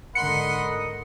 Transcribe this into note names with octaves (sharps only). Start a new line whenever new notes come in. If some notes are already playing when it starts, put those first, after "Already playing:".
G#2 D3 A#4 D#5 F#5 B5 C6 C#7